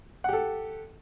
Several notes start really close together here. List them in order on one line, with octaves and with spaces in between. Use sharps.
F#5 G4 A4